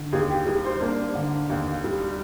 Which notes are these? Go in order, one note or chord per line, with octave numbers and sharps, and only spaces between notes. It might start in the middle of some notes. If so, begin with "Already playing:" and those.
Already playing: D3
D#2 G#4
G4
G3 G#4
C5
A#3 D4
D3
D#2
G3